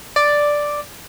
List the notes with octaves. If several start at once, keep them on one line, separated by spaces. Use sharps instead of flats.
D5